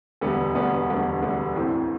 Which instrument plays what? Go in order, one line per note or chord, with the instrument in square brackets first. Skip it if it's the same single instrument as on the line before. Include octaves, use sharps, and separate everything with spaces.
[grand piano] E1 D2 D3 G3 B3
E1 D2 D3 G3 B3
E1 D2 D3 G3 B3
E1 D2 D3 G3 B3
A1 A2 E3 A3 C4